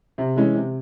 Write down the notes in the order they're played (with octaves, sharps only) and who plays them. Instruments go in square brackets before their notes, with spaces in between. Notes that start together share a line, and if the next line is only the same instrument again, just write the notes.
[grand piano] C3
E3 G#3 C#4
C3